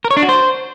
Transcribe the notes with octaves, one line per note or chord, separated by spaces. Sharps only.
A#4
C#5
D4
F#4
C5